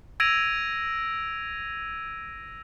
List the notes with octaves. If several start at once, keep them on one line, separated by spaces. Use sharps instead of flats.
E6 G#6 A#6 D7 D#7 F7